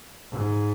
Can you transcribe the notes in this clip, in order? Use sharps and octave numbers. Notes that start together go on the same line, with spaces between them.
G#2